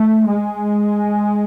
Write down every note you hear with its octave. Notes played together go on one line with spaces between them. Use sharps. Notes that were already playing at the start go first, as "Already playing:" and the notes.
Already playing: A3
G#3